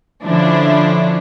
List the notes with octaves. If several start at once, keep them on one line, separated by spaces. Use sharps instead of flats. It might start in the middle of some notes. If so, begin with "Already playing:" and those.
D3 F3 C#4 D4 E4